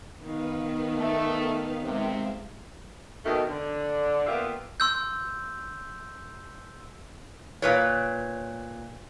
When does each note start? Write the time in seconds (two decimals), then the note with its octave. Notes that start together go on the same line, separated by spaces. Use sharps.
0.23 D#3 B3 B4 F5
0.96 A3
1.82 C3 G#3 E5 F5
3.25 B2 D#3 A3
3.48 D3
4.27 A#2 B3 F4 G4 E5 F5
4.80 C6 E6 G6
7.62 A#2 B4 C#5